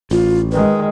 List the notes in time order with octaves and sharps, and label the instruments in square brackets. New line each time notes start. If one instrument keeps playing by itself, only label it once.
[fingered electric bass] A1 [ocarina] F4
[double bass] D#3 G#3 [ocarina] B4